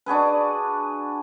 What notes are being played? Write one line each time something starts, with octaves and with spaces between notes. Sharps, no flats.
D4 F#4 G#4 B4